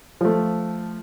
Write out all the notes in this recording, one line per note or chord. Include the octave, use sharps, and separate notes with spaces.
F3 A3